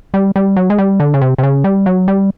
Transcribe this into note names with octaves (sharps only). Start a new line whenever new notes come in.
G3
G3
F#3
G#3
G3
D3
C#3
C3
C3
C#3
G3
F#3
G3